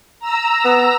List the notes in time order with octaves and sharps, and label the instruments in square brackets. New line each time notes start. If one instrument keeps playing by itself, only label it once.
[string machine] A#5 E6
[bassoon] B3